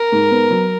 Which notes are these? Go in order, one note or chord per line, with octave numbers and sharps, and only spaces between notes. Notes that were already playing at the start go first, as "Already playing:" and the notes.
Already playing: A#4
G#2
B3
F#3